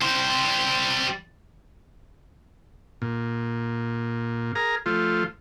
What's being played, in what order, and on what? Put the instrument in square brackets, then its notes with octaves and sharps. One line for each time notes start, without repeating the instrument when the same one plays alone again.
[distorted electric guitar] G3 C5
[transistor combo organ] A#2
G#4 A#4 A#5
F3 A3 F4